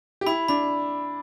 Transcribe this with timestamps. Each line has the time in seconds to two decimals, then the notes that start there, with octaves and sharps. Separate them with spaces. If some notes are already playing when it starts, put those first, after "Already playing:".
0.21 G4
0.27 E4 B5
0.48 D4 B5